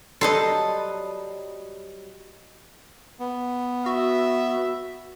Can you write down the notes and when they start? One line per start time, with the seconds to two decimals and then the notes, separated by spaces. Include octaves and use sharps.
0.21 F#3 G3 A4 B4 D#5 A5 C6
3.20 B3
3.86 F#4 E5